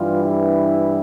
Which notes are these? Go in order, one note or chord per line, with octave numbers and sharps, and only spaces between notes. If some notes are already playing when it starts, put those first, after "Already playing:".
Already playing: G2 E3 G3 F4
E4